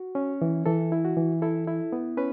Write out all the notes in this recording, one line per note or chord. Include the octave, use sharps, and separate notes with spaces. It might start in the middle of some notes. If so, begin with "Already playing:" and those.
Already playing: F#4
C#4
E3
E3 A4
E4
F#4
E3
E4 A4
E4
B3
C#4 B4